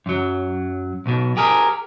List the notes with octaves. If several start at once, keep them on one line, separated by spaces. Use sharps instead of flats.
F#2 F#3
B1 B2
G4 G#4 A#4